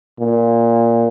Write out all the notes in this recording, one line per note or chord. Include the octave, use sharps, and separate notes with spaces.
A#2